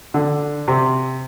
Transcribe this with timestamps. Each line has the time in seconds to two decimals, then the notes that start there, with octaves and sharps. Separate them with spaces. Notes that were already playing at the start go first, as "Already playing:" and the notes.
0.14 D3
0.68 C3